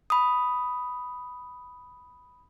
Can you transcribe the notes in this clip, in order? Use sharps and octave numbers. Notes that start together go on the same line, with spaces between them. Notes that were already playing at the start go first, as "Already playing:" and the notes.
B5 D#6